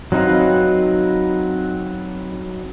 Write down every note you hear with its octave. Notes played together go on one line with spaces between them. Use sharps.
F#3 C4 D#4 B4 F5